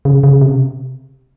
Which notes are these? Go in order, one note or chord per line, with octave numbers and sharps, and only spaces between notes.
C#3
C#3
C3